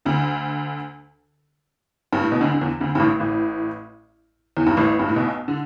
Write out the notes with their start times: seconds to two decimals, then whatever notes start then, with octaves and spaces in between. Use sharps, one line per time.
0.05 D2 D3
2.13 G2
2.22 A2
2.32 B2
2.41 D2 D3
2.54 D3
2.61 E2 E3
2.80 D2 D3
2.95 G2
3.00 A1 A2
3.20 A1 A2
4.57 E2
4.66 G2
4.77 A1 A2
4.99 G2
5.08 A2
5.16 B1 B2
5.48 D3